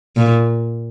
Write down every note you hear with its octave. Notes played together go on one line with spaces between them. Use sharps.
A#2